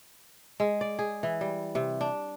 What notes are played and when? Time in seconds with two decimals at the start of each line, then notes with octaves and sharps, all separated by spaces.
0.60 G#3
0.81 D5
0.99 G#4
1.23 E3
1.41 G3
1.75 C3
2.01 D4